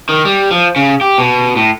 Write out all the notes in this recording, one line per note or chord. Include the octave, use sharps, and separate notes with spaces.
D#3
G3
F3
C#3
G4
B2
A2